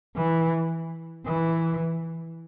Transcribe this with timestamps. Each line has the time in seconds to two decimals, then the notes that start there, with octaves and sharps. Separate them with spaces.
0.16 E3
1.26 E3